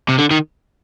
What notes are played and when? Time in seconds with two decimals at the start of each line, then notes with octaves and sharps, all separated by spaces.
0.09 C3
0.19 D3
0.31 D#3